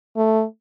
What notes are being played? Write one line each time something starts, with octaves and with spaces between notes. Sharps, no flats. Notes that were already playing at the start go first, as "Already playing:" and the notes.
A3